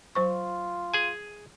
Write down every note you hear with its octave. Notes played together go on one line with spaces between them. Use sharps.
F#3 F4 C5 C#6
G#4 G#5